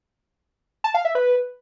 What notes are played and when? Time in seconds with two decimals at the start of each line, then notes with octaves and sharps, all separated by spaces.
0.84 A5
0.94 F5
1.05 E5
1.15 B4